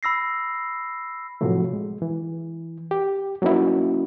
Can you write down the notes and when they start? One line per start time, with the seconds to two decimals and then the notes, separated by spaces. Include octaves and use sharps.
0.03 B5 E6 A#6 C7
1.41 A2 C3 F3 F#3 A3
1.73 G#3
2.02 E3
2.91 G4
3.42 F#3 A#3 C#4 D#4 E4